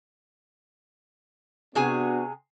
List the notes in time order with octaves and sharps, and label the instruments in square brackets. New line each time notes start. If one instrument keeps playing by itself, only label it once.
[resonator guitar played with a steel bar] C3 G#4 G#5 [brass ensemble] B3 D4 F#4